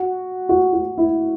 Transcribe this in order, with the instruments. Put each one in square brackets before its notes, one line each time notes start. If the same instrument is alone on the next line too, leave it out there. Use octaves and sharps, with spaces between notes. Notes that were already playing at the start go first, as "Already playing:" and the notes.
Already playing: [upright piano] F#4
F#4
F#4
E4